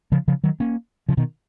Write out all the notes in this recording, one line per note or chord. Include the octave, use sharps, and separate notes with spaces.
C#3 F3
C#3 F3
D#3 F#3
A#3 C#4
C#3 F3
B2 D#3